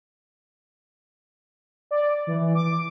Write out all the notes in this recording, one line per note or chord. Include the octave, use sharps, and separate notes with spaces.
D5
E3
D6